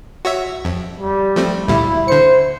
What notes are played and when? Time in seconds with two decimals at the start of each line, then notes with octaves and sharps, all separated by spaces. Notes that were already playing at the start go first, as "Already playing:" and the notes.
0.25 F#4 C#5 E5
0.65 F2
1.00 G3
1.36 F3 A3 C4
1.68 D2 A#2 G3 E4
2.08 D3 C5 C#7